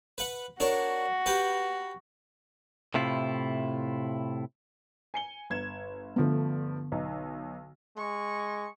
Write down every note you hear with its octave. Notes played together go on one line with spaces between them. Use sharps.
B4 F#5
D4 F#4 A#4 C#5
G4 B4
A2 C3 E4 F4
G#5 C#7 G7
G1 G#6 E7
G2 D3 F3 A3 B3
B1 D#4
G#3 C#6